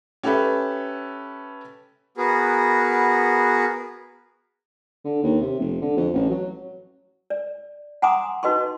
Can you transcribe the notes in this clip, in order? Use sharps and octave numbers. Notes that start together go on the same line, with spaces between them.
C#4 G4 A4 B4 E5
B3 F#4 G#4 A#4 B4
D3
D#2
C3
F1
D3
F2
A1
F#3
D5
F#5 G#5 A#5 C6 D6 D#6
D#4 F#4 B4 D#5 C6 C#6